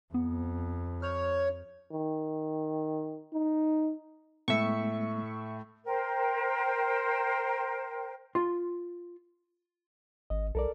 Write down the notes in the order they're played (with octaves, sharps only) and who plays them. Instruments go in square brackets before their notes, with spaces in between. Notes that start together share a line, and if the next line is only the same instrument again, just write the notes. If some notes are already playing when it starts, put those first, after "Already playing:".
[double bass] F2 [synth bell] B3
[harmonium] C#5 [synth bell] F6 G6 F7
[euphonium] D#3
D#4
[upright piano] A2 [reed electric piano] G#3 A3 B3 [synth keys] E5 C#6
[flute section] A#4 C5 G5
[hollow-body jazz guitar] F4 C6
[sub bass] G#1 [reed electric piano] D#5
[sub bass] B1 [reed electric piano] A4 A#4 D5